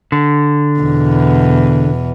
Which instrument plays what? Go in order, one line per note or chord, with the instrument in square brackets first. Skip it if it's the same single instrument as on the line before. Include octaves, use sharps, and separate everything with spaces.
[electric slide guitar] D3
[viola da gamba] E2 B2